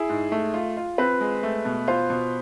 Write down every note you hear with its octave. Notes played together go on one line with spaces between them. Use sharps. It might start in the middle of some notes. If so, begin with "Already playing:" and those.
Already playing: E4 G#4
G#2
A3
F4
F4
C4 B4
G#3
A3
B2
F4 C5
B2